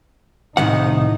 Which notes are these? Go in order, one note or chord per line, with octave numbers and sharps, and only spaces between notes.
C2 A2 D#3 D#4 F#5